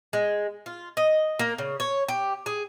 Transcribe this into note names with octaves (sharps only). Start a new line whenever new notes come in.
G#3
F4
D#5
A#3
C#3
C#5
G4
G#4